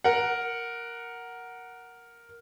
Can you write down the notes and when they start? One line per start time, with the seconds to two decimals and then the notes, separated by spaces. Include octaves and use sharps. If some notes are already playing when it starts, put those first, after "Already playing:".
0.04 A#4 F#5